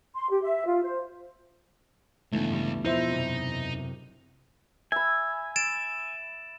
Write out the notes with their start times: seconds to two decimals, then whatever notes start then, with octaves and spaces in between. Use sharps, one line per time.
0.15 C6
0.30 G4
0.42 E5
0.66 F4
0.84 C5
2.32 G1 C#2 E3 A3
2.50 G2 G3
2.85 E1 E2 F3 D#4 E4 C5 E5 G6
3.11 F#2 C3
4.92 E5 G#5 B5
5.56 A6 D7 E7